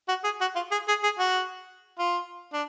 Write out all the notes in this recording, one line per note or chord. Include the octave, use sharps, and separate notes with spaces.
F#4
G#4
F#4
F4
G#4
G#4
G#4
F#4
F4
D4